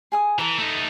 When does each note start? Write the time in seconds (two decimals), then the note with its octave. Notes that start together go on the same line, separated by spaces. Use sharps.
0.12 G#4 G#5 D#6
0.39 E3 A4 A#5
0.58 A3 D#4